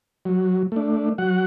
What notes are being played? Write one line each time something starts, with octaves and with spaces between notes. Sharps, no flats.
F#3
A3 D4
F#3 F#5